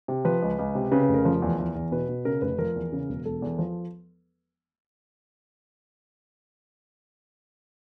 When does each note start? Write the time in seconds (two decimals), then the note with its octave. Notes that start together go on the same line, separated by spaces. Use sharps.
0.08 C3
0.25 F3 B4
0.42 C#2
0.59 C#2
0.75 C3
0.91 C#3 B4
1.03 B4
1.09 F1
1.14 A#4
1.25 F3
1.42 E2
1.59 E2
1.75 E2
1.92 B2 B4
2.09 B2
2.25 C#3 A#4
2.42 F1 B4
2.59 F3 A#4
2.76 E2
2.92 C#3
3.09 E1
3.25 E1 A4
3.42 E2
3.59 F3